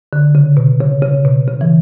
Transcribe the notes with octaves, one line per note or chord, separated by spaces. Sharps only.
D3
C#3
B2
C#3
C#3
B2
C#3
E3